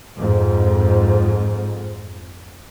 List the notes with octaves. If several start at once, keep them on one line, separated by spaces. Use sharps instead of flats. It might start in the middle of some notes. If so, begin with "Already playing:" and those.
F2 G#2